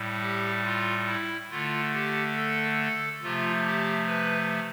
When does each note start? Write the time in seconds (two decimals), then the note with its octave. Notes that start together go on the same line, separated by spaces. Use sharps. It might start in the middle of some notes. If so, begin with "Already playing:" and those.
Already playing: A2 G3
0.21 G4
0.64 F4
1.07 E4
1.50 D3 A3 F4
1.93 G4
2.37 A4
2.79 A4
3.22 C3 F3 A3 F4
3.64 G4
4.07 B4